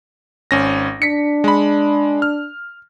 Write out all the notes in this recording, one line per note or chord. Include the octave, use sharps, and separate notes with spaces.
G#1 C#4 A#6
D4 B6 C#7
G#3 B5
F6